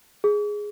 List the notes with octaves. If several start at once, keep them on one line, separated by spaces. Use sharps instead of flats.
G#4